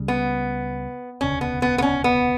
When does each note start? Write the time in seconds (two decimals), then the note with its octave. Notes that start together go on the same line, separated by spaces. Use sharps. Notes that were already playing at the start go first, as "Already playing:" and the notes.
Already playing: C#2 C#3 G3
0.08 B3
1.21 E1 D2 C#3 C#4
1.41 B3
1.62 B3
1.78 B3
1.82 C#4
2.04 B3